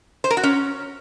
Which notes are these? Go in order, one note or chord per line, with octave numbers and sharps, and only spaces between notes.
C5
A#4
F#4
C#4